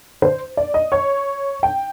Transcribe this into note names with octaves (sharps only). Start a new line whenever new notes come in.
C5
D5
D#5
C#5
G5